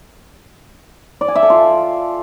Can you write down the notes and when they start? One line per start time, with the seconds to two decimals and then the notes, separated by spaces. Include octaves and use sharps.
1.21 D5
1.28 G#5
1.35 E5
1.43 A4
1.50 F4